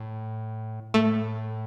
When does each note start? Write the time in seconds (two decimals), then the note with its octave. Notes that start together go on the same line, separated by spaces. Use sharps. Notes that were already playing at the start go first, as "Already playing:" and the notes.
Already playing: A2
0.94 A2 A3